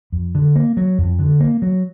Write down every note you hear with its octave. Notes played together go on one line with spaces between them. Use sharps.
F2
D3
A#3
F#3
F2
D3
A#3
F#3